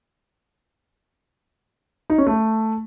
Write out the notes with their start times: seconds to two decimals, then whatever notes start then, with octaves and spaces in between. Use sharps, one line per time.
2.10 D#4
2.18 C#4
2.27 A3